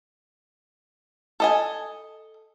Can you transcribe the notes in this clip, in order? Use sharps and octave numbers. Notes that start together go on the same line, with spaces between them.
A4 D#5 G#5